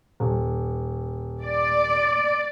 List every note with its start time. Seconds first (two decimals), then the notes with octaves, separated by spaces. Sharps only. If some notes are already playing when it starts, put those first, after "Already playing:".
0.20 D#1
1.42 D5